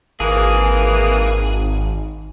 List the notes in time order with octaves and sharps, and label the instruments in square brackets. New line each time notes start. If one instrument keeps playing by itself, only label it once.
[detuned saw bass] G#1 [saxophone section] E3 A#3 [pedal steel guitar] G#4